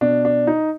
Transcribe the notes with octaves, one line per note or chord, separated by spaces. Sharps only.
B2 D4
D4
D#4